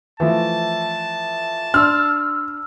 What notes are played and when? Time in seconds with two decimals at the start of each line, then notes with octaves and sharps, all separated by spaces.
0.20 E3 F3 A3 A5
1.74 D4 C6 E6 F6